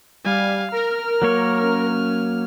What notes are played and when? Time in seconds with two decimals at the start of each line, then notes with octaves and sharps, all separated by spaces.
0.25 G3 F5 G#5
0.72 A#4 F6
1.22 F#3 A#3 C#5
1.58 C#4 F6